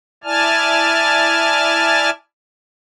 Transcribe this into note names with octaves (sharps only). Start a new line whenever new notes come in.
E4 D5 G#5 A5 F6